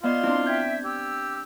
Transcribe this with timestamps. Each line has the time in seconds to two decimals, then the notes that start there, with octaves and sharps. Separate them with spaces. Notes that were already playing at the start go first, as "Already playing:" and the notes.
0.04 B3 F4 D5 D#5 F5 C6
0.23 C4 D4 E4
0.46 E5 G5 G6 G#6
0.84 G4 E6